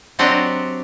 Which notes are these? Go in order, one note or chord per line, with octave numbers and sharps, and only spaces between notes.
F#3 C4 D4 F#4 G4 D#5